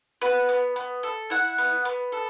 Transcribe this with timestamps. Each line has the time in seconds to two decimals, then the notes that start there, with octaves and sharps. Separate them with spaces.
0.21 F#4 B4
0.49 B3
0.76 B3
1.03 A4
1.30 E4 F#5
1.58 B3
1.85 B3
2.12 A4